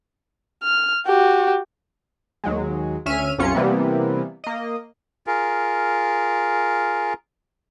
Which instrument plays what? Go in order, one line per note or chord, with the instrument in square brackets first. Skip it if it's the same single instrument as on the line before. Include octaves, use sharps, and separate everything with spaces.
[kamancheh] F6
F#4 G4
[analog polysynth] D#2 F#3 G#3
D2 C#4 E5 F6 D#7
C2 F#2 C3 C#4 F4 C#7
C3 E3 G3 A#3 B3
A#3 D#5
[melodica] F4 G#4 A#4